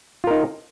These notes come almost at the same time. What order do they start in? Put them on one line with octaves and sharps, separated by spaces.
F4 A#4 D#4